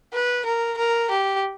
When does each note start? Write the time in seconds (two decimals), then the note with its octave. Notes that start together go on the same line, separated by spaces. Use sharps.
0.13 B4
0.45 A#4
0.78 A#4
1.11 G4